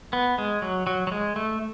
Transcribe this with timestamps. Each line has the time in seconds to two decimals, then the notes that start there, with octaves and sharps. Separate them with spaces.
0.13 B3
0.38 G#3
0.62 F#3
0.87 F#3
1.07 F#3
1.12 G#3
1.36 A3